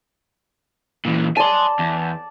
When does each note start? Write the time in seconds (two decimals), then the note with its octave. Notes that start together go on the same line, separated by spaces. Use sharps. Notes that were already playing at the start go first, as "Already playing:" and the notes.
1.05 A#2 E3
1.37 D5 G#5 A5 C6
1.79 E2